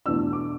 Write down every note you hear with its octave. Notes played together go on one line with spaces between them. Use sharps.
E2 B2 A3 D4 E6
D6